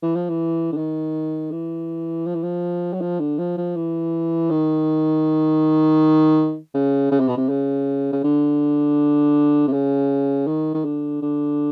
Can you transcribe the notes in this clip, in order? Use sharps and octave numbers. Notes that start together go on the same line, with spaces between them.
E3
F3
E3
D3
D#3
E3
F3
E3
F3
F#3
F3
D3
F3
F3
E3
D#3
C#3
C#3
C3
B2
C3
C#3
C#3
D3
C3
C#3
D#3
D#3
D3
D3